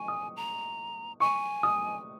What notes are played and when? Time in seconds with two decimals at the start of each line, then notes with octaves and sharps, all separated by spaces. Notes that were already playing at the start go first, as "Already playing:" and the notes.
Already playing: G#5 C#6
0.08 D#6
0.37 A#5
1.20 G#5 C#6
1.63 D#6